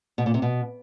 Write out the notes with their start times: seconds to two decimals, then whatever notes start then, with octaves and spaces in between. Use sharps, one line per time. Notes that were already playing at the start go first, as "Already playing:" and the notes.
0.18 B2
0.26 A#2
0.34 C3
0.42 B2